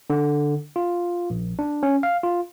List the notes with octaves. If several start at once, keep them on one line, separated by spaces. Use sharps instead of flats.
D3
F4
A#1
D4
C#4
F5
F4